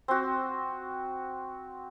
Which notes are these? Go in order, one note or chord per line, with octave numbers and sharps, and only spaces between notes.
C4 F#4